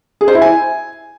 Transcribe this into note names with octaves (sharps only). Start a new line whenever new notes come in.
G#4
C5
E4
G#5